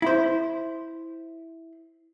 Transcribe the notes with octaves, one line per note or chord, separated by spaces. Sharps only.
E4 C5